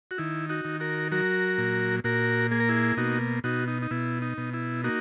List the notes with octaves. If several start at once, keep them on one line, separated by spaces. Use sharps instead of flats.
F#4
D#3 E4
D#4 F#4
D#3
F#4 A#4
F#3 F#4 A#4
A#2
A#2 F#4 A#4
A#3 G#4
A#4
E4 G#4
B2 D#4 F#4
B2 D#4 F#4
D#4
D#4
B2 E4
D#4
B2
E4
A#3 D#4 F#4